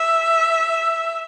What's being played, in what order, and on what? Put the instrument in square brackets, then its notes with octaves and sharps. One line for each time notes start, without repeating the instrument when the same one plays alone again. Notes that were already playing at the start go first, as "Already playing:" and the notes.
Already playing: [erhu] E5